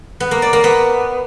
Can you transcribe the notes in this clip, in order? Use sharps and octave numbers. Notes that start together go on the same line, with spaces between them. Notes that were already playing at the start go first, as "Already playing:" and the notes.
B3
A#3
D5
A#3
B3